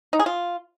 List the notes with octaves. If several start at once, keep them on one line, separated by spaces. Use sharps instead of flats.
D#4
G#4
F4